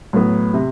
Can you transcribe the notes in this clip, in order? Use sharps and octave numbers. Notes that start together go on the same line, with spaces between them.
A2 F#3 B3
C3